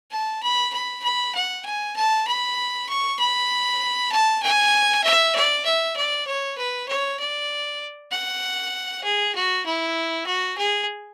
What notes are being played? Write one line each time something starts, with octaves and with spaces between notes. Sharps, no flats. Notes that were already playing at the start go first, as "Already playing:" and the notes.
A5
B5
B5
B5
F#5
G#5
A5
B5
C#6
B5
A5
G#5
E5
D5
E5
D5
C#5
B4
C#5
D5
F#5
G#4
F#4
E4
F#4
G#4